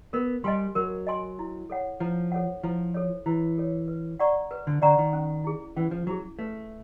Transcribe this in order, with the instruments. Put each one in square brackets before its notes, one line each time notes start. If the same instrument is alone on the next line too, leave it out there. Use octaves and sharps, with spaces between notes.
[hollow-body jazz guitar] B3 [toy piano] A#4
[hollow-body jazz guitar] G3 [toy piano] D#5 G#5 C6
[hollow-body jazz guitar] F#3 [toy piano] A#4
[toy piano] D#5 G#5 C6
E4
A4 C#5 F#5
[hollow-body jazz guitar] F3 [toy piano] E4
[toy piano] A4 C#5 F#5
[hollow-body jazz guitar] F3 [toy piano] E4
[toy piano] A4 C#5
[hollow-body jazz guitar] E3 [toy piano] E4
[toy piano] A4 C#5
B4
D5 F#5 A#5 C#6
B4
[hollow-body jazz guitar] D3
[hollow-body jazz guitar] D3 [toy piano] D5 F#5 A#5 C#6
[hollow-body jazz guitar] D#3
[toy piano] C#4
E4 G#4
[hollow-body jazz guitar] E3 [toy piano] C#4
[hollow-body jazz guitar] F3
[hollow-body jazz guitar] F#3 [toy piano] E4 G#4
[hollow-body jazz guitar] A3 [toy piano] B4